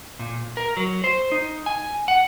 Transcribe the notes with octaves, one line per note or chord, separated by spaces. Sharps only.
A#2
A#4
F#3
C5
D#4
G#5
F#5